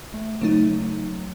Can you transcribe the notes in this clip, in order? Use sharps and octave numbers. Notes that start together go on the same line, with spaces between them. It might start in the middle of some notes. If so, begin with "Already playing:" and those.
A3
C#3 F#3 A3 D#4